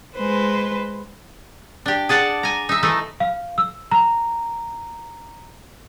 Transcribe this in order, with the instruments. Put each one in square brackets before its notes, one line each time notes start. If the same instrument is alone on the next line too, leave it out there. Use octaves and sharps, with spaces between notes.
[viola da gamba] G#3 B4 C5
[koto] D4 G4
G#4 D5 F#5 A5
G#5 A#5
D#4 E5
E3 A3 D#4
[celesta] F5
E6
A#5